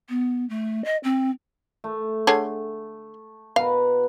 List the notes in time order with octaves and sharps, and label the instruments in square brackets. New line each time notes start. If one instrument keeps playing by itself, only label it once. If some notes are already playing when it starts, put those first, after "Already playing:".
[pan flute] B3
A3
D#5
C4
[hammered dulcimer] A3
[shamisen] D3 G#4 C#5
[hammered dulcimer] B2 B4 A#5 [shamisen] F5